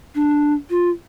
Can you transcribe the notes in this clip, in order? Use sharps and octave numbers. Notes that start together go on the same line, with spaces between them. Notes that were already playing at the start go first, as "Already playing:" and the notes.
D4
F4